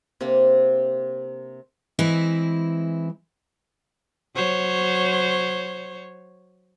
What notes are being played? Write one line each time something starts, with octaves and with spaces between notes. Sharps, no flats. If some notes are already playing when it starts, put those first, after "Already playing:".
C3 A#3 C4 D4
E3 G#3 C4 E4
F#3 C5 C#5